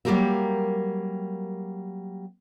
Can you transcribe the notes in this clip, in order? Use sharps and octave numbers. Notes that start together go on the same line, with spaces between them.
F#3 G3 A#3 G4 A#4 E5